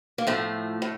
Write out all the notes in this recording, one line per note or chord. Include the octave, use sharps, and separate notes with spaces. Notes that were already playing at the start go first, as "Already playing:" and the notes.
A#3
A2 F3 A3
A2